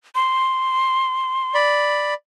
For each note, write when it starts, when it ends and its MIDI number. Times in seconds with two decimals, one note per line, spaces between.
0.15 1.56 84
1.55 2.14 74
1.55 2.14 83